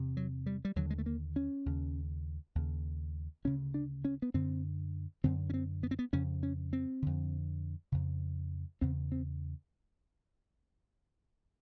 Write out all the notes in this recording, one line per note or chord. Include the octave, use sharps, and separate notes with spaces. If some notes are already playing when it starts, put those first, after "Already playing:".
Already playing: E2 C3
F#3
G3
G3
D#2 D3 F#3
G#3
A3
A#3
C#4
D#2 C#3
D#2 C#3
D2 C#3 C#4
D4
C#4
B3
F#2 D3 C4
F#2 D3 C4
C#4
C4
B3
C4
B3
F2 C#3 C#4
C#4
C4
F2 D3
F2 C#3
E2 C#3 C4
C4